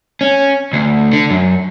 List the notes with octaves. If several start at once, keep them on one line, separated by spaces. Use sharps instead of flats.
C#4
D2
D3
F#2